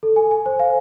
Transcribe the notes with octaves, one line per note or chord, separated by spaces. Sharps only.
A4
G#5
G#5
C5
F5